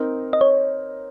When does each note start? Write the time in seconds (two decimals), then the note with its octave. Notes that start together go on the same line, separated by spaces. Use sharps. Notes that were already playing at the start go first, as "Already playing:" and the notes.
Already playing: C4 D#4 A#4
0.33 D#5
0.41 C#5